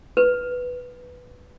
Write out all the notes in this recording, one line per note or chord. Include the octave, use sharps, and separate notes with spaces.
B4